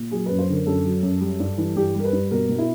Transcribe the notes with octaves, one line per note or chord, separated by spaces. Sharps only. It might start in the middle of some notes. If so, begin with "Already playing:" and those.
Already playing: A#2
F#3 G#4
F#2 B4
C5
D3 A#4
F#2 A4
F#3
F#2
G3
G2
E3
G2 G4
G3 A#4
B4
G2
B2 A#4
B2
E4